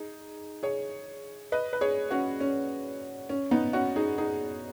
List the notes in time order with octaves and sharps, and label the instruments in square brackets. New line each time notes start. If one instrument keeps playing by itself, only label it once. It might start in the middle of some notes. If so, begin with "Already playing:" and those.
Already playing: [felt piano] D#4 G#4
G#4 C#5
B4 D#5
B4
G#4 C#5
C#4 F#4
C#4
C#4
B3 D#4
C#4 F#4
D#4 G#4
D#4 G#4